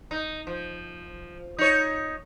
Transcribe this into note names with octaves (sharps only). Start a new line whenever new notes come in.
D#4
F3
D#4 C#5